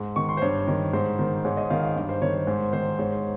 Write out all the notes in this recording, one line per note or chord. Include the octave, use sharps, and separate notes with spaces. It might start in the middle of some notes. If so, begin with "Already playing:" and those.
Already playing: G#2
D#3 C#6
C6
C5
G2 C#5
D#3
G#2 C5
D#3
G#2 C#5
D#5
D#3 F5
F5
G2
C5
D#3 C#5
C#5
G#2 C5
D#3 C5
G#2 C#5